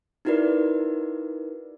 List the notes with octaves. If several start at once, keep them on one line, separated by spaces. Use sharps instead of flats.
D#4 E4 F#4 A#4 B4 D5